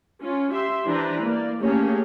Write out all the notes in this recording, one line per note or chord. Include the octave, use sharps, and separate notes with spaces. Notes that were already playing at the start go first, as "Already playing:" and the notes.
C#4 F4
G4 E5 C6
E3 D4 E4 B4 C5 A#5
A#3 D5
A3 A#3 C#4 G4 G#4 C#5